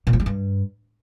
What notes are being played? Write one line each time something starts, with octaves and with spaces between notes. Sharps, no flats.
A#2
F3
G3
G2